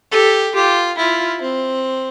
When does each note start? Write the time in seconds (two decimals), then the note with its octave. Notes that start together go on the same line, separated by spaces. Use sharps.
0.12 G4 A4
0.54 F4 G4
0.98 E4 F4
1.41 C4